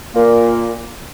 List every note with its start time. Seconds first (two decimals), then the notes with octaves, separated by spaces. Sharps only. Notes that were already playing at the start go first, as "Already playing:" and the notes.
0.15 A#2 A#3